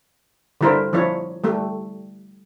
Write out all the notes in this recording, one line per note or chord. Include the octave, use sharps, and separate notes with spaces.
D3 G3 E4 A#4 C5
F3 D4 E4 C#5
G3 A3 G4